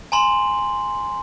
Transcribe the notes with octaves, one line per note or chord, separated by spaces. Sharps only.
G#5 A#5 C6 F#7